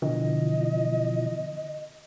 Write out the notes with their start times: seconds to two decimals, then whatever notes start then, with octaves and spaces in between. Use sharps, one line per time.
0.02 B2 D3 E3 F3 D#5